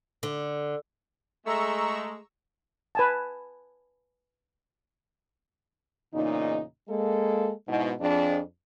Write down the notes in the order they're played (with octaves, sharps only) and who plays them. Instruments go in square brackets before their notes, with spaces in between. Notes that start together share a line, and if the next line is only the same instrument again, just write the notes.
[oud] D3
[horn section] G#3 A3 [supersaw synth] A#5 C#6 E6
[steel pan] B4 G#5 A5
[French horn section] E2 A#2 C#3 D#4
G#3 A#3 A4
G#2 B2 E4
F2 D4 G#4